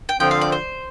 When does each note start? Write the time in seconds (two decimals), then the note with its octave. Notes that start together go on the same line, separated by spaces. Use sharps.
0.09 G5
0.20 D3 F3 C4 G5
0.31 F5
0.41 D5
0.52 C5